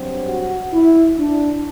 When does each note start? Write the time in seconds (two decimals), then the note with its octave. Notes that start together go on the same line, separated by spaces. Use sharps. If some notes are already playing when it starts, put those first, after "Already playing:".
Already playing: G2 F#3 C4
0.29 F#4
0.73 E4
1.18 D4